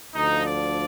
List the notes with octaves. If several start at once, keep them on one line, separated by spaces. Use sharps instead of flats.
D2 D3 F3 D#4
D5